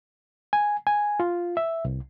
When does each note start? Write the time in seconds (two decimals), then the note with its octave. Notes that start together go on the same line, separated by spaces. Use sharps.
0.53 G#5
0.87 G#5
1.20 F4
1.57 E5
1.85 C2